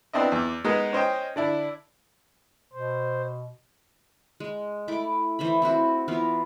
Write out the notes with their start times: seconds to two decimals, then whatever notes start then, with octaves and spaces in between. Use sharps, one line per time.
0.13 B3 C4 D4 E4 D#5
0.32 E2 D6
0.65 G#3 B3 D#4 A#4
0.93 C#4 C5 D#5 G5
1.36 D3 D4 E4
2.73 B2 C5
4.40 G#3
4.88 A3 E4 D6
5.39 E3 C5 C#5 B5
5.62 C4 E4 F#4
6.08 E3 B3 F4 A#4